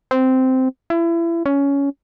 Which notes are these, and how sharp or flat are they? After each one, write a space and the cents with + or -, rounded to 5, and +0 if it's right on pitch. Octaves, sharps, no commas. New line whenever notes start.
C4 -10
E4 +30
C#4 +15